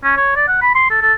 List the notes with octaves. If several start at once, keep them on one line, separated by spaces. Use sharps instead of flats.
C#4
C#5
D5
F#5
B5
C6
A4
A4